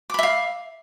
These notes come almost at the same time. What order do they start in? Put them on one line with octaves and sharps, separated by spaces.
D6 B5 E5 F5